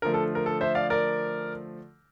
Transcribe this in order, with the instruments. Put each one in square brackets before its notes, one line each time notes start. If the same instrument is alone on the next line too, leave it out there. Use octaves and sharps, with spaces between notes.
[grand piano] D3 F3 A3 A#4
A4
A#4
A4
C5 E5
D5 F5
A#4 D5